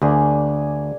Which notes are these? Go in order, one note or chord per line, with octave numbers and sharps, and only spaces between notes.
D2 A#3 D4 G#4